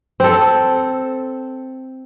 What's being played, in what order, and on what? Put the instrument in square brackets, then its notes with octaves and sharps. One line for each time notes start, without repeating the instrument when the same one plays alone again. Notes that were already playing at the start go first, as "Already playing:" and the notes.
[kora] C4 A4